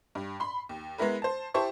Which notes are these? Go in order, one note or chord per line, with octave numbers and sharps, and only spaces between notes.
G2
B5 C6
D#2
G#3 B3 E4 A#4 B4
C5 A5
E4 G4 C5 A5 C#6